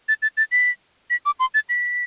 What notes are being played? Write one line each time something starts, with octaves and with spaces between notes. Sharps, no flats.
A6
A6
A6
B6
B6
D6
C6
A6
B6